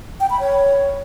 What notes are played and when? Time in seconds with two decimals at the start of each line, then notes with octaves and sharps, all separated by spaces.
0.20 G5
0.30 B5
0.40 C#5